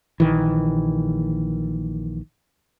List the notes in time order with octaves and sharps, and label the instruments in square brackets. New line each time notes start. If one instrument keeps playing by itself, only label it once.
[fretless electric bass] A#1 D#3 E3